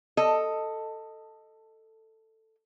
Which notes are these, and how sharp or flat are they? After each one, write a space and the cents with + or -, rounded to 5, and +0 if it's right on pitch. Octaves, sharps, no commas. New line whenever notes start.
A4 +10 D#5 +0